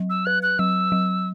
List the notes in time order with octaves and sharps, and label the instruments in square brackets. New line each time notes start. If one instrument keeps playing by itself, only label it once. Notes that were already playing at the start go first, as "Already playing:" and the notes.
Already playing: [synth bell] F#3
[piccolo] E6
[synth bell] B4 [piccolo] F#6
[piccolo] F#6
[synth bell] F#3 [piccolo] E6
[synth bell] F#3